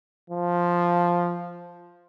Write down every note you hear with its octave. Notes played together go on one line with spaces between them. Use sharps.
F3